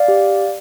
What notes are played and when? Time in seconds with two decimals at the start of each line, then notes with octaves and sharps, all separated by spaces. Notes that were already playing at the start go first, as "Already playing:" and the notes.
Already playing: D5 F5
0.08 G4